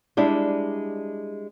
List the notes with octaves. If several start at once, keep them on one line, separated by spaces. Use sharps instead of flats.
G3 G#3 D4 E4